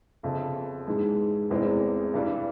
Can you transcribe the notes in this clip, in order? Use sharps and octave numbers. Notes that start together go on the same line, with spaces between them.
G1 F2 C#3
G#2 E3 G#3
F1 E2 E3 G#3 C4
G2 E3 G3